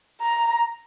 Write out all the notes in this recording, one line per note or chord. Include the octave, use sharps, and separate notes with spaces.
A#5